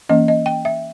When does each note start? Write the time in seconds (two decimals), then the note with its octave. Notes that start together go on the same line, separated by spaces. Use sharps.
0.09 E3 A#3 C#4 D#5
0.28 D#5
0.46 G5
0.65 E5